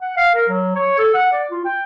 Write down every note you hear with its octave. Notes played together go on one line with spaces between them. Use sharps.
F#5
F5
A#4
F#3
C#5
A4
F#5
D5
F4
G5